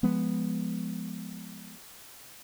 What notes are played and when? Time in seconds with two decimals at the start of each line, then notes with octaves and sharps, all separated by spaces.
0.03 F3 G#3 B3